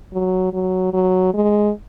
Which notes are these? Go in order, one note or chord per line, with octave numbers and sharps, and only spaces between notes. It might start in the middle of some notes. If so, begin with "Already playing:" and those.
F#3
F#3
F#3
G#3